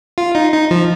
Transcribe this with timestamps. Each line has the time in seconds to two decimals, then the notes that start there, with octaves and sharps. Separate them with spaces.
0.18 F4
0.35 D#4
0.53 D#4
0.71 F3